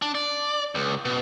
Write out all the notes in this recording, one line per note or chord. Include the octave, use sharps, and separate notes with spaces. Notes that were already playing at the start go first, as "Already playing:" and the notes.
D4
D5
C#2
B2